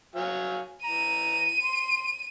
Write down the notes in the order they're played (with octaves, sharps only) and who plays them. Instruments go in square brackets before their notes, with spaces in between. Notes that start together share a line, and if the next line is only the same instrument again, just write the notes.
[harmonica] F#3 F5 G#5
[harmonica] E3 A#5 [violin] D#7
[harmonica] C6